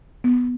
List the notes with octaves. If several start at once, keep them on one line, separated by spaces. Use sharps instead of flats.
B3